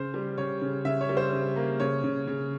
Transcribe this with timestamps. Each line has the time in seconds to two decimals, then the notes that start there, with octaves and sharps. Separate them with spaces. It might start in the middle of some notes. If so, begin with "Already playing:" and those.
Already playing: C#3 C5
0.14 G3
0.38 C#3 C#5
0.61 C#3
0.85 C#3 E5
1.01 C#5
1.09 G3
1.17 C5
1.32 C#3
1.56 A#3
1.80 C#3 C#5
2.04 C#3
2.27 C#3